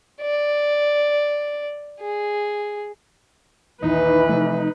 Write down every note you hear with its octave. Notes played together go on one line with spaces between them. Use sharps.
D5
G#4
A#1 D#2 E3 D#4 B4
C3 F3 A3